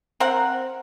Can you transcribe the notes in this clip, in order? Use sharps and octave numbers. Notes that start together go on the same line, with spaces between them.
C4 A#4 F#5